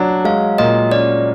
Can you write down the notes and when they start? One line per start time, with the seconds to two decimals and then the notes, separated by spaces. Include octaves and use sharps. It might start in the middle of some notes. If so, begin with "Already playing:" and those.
Already playing: F#3 D4
0.25 G#3 F5
0.58 A#2 D#5
0.91 C#4 D5